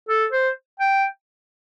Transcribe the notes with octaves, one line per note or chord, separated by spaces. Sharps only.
A4
C5
G5